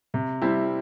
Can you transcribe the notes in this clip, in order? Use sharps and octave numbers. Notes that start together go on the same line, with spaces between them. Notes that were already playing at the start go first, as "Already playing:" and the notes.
C3
G3 C4 E4